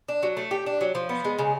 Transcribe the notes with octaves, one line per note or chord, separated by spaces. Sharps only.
D4
F#3
A3
G4
D4
F#3
F3
B3
G#3
C#3